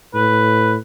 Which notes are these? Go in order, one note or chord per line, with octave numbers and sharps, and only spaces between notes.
A2 B4